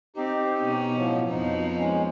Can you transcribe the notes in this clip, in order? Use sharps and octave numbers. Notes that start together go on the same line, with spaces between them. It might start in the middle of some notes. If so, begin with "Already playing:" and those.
C4 D#4 G4
B2 B3 C#4
A2 F3 F#3
F2 F3 B3 D#4
G#3 C#4